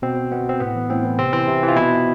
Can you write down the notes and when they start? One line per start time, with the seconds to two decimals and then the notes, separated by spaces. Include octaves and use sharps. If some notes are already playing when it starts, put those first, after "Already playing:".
0.02 B2 C4
0.32 B2 B3
0.49 C4
0.60 A2 B3
0.75 E3
0.90 A2 C4
1.04 E3
1.19 C3 C4
1.33 E3 C4
1.48 C3
1.62 E3
1.68 F4
1.76 B2 E4